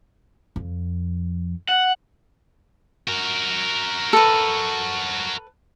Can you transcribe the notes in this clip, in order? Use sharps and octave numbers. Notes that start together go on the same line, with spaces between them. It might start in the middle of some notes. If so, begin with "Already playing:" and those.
F2
F#5
F#4 A#4
A4 B4